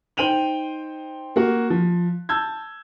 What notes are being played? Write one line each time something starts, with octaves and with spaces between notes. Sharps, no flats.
D#4 C5 G5 D#7 F7 F#7
A#3 F#4
F3
A5 E6 G6 G#6